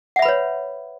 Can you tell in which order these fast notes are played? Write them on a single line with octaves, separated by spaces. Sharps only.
F#5 E5 B5 B4 C#5